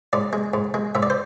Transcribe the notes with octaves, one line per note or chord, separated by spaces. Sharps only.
G#2 D5
G#3
G#2
G#3
G#2 E5
D5
C5